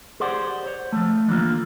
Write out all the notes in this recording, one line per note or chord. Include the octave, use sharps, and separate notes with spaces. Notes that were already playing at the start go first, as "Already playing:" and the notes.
G4 G#4 C5 D5 F#5
C5 C#5
F3 A3
D3 E3 A#3 F4